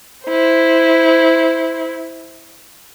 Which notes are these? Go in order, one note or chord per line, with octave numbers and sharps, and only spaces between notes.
E4 C5